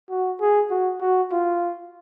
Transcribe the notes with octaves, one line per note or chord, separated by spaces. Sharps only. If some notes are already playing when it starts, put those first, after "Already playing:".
F#4
G#4
F#4
F#4
F4